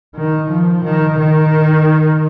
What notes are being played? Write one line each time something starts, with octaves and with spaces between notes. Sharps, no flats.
D#3
F3
D#3
D#3